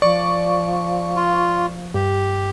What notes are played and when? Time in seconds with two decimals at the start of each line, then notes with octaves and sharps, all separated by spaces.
0.02 F3 D5 C#6
1.16 F4
1.94 G2 G4